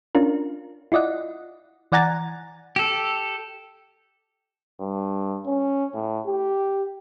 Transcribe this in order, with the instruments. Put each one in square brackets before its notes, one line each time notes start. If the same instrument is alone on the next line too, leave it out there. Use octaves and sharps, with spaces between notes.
[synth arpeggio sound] C#4 D4 F4 A#4
E4 F4 D5 D#5 F#5
E3 D5 F#5 G#5 A#5 A6
[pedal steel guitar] G4 A4
[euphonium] G2
C#4
A2
G4